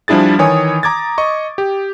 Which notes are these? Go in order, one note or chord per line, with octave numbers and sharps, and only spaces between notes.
F3 G3 D4 E4 G#4 A6
D#3 E3 C#5 G#5 D#6
A#5 D6 G#6 A6
D#5 C#6
G4